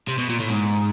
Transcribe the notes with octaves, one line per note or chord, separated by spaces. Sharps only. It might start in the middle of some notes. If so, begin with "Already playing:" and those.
C3
B2
A#2
A2
G#2